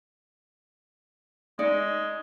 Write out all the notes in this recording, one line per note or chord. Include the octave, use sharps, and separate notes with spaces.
G#3 D#4 D5